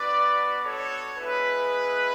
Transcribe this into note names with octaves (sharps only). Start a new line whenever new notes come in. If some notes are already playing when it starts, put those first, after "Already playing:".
Already playing: B3 D4 F#4 B4 D5
A4 C#5
G#3 B3 E4 G#4 B4